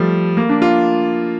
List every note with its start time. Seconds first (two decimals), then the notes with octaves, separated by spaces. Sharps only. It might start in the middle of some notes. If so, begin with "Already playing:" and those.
Already playing: F3 G3 A3
0.37 A#3
0.49 D4
0.62 F4